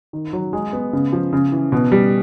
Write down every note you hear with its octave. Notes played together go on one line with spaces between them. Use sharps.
D#3
F#3
G#3
B3
C#3
F3
C#3
E3
B2
G3